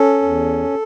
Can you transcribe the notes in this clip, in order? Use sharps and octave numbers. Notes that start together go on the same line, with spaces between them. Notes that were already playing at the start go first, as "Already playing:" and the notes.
Already playing: C#4 A4
E2